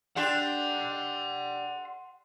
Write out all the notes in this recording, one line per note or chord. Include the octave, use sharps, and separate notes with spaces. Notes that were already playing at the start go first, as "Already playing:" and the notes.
D4 G4 F#5 C6